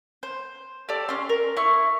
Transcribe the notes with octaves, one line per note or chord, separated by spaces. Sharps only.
C5
G4 A4 D5
C#4 C6
A#4
E4 C#6